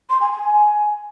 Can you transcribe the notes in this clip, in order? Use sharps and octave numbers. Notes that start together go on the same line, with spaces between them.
C6
G#5
G#5